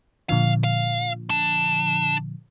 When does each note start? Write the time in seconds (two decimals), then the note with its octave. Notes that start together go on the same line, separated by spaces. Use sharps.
0.29 A#2 D3 F3 F5
0.64 F5
1.30 D4